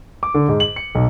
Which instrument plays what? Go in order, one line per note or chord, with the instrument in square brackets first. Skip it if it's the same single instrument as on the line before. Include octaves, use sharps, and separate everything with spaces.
[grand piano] D6
D3
G#2
F#7
C#7
B1